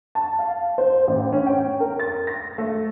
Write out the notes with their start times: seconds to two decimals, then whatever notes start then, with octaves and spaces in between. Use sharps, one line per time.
0.15 A5
0.39 F5
0.78 C5
1.07 A1
1.33 C#4
1.46 G5
1.80 A#4
1.99 A6
2.27 A#6
2.58 A3